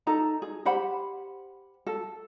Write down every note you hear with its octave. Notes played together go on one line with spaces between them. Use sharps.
D#4 A4 A#5
G#4
G4 C5 F#5 B5
A4